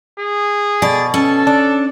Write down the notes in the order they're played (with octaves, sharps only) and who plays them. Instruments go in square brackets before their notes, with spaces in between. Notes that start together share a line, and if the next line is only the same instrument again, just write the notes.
[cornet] G#4
[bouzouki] B2 [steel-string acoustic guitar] D5
[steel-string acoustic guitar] C#4 [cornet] A4
[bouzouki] D4